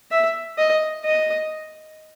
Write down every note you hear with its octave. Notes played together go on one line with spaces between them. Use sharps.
E5
D#5
D#5